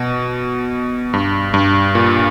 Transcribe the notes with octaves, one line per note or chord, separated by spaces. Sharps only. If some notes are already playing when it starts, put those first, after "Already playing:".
Already playing: B2
G2
G2
A#2